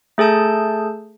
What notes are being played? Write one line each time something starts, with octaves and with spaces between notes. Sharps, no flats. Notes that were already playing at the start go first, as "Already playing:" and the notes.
A3 G#4 A4 A5 G6